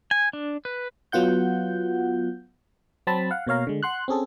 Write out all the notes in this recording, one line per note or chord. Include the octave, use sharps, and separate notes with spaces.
G#5
D4
B4
F#3 B3 F4 F#5 G6
F#3 C4 A5 B5
F5 F#5
B2 A#3 C#5 F5 A#5
D3 G#3
F#5 C6 F#6
C4 C#4 G#4 A4